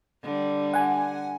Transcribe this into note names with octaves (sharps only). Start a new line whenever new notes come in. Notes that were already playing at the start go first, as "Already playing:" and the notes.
D3 G3
F#5 G#5